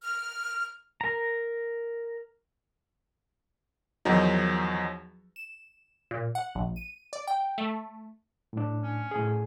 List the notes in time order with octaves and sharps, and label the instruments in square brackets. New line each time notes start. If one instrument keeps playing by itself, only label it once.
[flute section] F6
[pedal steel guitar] A#4 A#5
[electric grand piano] E2 D#3 F3 F#3 D#4
[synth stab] E7
A#2
F#5
A#1
D#7
D5
G5
A3
[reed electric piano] A2 D4
[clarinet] C#4
[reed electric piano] A2 G#4